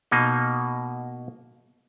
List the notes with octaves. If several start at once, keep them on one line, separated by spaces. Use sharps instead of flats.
B2 A#3 D#4